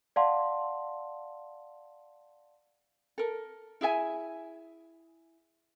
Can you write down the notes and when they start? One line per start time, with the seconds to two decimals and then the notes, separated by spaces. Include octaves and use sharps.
0.16 D5 F5 F#5 A5 C6
3.18 A4 A#4
3.81 E4 G#4 E5 G#5